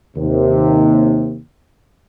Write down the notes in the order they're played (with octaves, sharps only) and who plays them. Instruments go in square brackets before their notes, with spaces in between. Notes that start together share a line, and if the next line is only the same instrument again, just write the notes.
[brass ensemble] D#2 C3